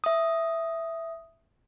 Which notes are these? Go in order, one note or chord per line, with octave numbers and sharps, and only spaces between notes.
E5 D#6